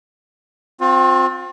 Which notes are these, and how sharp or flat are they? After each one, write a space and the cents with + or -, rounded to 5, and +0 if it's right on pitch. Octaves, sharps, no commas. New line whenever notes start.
C4 +0 F4 +40